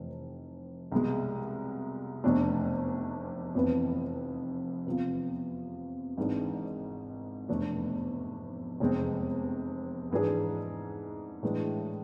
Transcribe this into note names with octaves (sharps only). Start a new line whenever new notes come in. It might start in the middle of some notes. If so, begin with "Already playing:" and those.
Already playing: F1 E3
C2 B2 G#3
F1 E2 B2 A3 D4
F1 F2 C3 E3 B3
E2 C3 F3
G#1 G#2 E3 G#3 D4
F1 E2 B2 A3 D4
F1 E2 C3 G#3 C4
G#2 E3 G#3 D4 G#4
A2 E3 G#3 D4